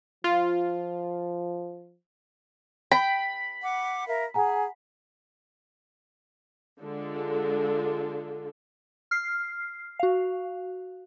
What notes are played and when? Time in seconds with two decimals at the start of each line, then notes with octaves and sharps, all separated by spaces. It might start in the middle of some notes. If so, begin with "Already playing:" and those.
0.24 F3 F4
2.91 G5 B5
3.62 F#5 D6
4.08 A#4 E5 F5
4.34 G#4 F#5 G#5 A#5
6.80 D3 G#3 D4 F4 A4
9.11 F6 C7
10.00 F#4 F5